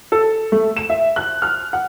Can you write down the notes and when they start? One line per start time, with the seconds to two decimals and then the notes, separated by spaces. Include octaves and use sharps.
0.12 A4
0.52 A3
0.77 E7
0.90 E5
1.16 F#6
1.42 F6
1.73 F#5